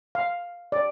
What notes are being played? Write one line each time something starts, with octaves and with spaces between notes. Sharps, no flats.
F5
D5